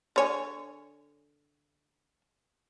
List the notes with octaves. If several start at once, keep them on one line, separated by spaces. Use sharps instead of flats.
D3 C#5 G#5